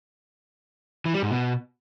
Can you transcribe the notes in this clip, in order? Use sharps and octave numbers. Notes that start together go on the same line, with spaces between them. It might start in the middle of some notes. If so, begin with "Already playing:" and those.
E3
G3
G#2
B2